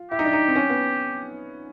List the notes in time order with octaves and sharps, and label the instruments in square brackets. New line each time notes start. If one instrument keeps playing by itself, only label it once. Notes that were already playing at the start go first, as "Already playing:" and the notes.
Already playing: [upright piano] F4
[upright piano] E4 [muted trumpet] G4
[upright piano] D#4
D4
D#4
C4
C#4
B3